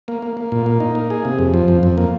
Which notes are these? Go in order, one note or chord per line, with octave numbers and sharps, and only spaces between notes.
A#3
A#3
A#3
A#2
A#3
D#4
A#3
G#4
C3
F2
F3
F2
F2
A#3